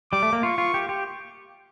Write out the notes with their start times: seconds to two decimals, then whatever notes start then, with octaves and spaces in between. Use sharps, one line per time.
0.12 G3 D6
0.23 A3
0.33 A#3
0.43 F4 C#6
0.58 F4
0.74 G4
0.89 G4